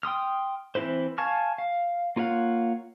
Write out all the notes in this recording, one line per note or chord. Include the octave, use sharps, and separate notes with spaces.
G5 C6 D#6 F6
E3 C4 E4 B4 C5
F5 G#5 A5 C#6 F6
F5
A#3 F4 C#5 F5 F#5